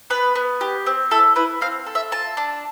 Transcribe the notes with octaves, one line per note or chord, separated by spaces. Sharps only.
B3 B4
B3
G4
C4
E4 A4
E4 B4
C4 F5
A4
E5
F4 A5
D4